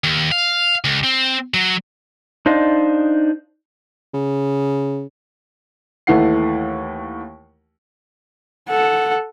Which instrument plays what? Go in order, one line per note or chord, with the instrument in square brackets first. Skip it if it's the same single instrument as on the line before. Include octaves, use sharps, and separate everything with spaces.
[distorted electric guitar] D#2
F5
C#2
C4
F#3
[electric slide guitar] D4 D#4 C5 D5 D#5 F5
[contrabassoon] C#3
[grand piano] D#2 E3 A3 F#5 C7
[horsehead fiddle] A4 F#5